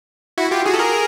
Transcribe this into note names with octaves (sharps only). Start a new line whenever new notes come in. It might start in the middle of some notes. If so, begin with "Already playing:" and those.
E4 F#4
F4 G4
F#4 G#4
A4
G#4 A#4